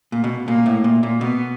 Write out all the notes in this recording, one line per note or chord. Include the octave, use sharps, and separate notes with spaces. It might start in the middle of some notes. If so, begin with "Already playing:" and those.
A#2
B2
A#2 A#3
A2
A#2
A#2
B2 B3